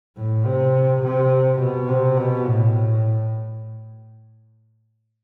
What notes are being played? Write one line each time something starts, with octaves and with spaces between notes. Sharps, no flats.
A2
C3
C3
B2
C3
B2
A2